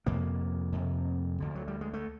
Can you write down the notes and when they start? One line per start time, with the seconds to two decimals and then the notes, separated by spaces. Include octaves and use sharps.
0.06 F2 C3 A#3
0.72 F2 C3
1.40 D2 D3
1.55 F#3
1.68 G3
1.81 G#3
1.94 A3